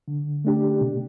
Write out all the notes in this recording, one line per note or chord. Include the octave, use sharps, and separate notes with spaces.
D3
A3 D4 G4
B2